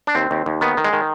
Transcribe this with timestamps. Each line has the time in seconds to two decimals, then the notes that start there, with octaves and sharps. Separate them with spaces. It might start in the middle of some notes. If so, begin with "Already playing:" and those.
0.07 D4
0.15 D#2 C4
0.31 D#2
0.46 D#2
0.61 D#3 B3
0.77 D#3
0.85 G#3
0.93 D#3